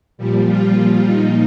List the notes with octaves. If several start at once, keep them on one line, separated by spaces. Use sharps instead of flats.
A#2 F3 G3
F4
F4
A#2 F3 D#4